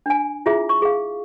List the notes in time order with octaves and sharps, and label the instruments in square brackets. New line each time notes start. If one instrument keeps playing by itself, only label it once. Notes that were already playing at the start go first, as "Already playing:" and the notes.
[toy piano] D4 G#5
E4 F4 G#4 E5
C#6
G#4 F5